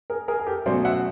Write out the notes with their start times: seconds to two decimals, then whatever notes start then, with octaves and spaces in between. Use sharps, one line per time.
0.10 G#4 A#4
0.28 G#4 A#4
0.40 G#4
0.47 G4 A4
0.66 B2 F#3 A3 C#4 C5 D5
0.85 E5 F#5